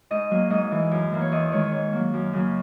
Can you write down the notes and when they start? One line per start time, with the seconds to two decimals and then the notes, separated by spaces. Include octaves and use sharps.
0.10 G#2 D#5
0.31 F#3 A#3
0.50 G#2 D#5
0.71 E3 G#3
0.91 F#2
1.12 E3 A#3
1.21 C#5
1.32 E2 D#5
1.52 D#3 G#3 C#5
1.72 G#2 C#5
1.93 F#3 A#3
2.14 F#2
2.33 C#3 F#3 A#3